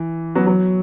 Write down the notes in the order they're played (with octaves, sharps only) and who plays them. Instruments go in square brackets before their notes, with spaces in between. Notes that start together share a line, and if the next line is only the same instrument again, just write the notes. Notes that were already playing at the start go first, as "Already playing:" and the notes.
Already playing: [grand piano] E3
F#3 B3
F#3